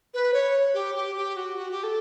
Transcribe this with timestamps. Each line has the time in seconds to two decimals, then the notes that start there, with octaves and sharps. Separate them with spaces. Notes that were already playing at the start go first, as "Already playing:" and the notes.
0.14 B4
0.33 C#5
0.74 G4
0.95 G4
1.15 G4
1.36 F#4
1.56 F#4
1.70 G4
1.83 A4